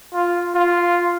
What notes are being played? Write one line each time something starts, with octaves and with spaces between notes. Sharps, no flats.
F4
F4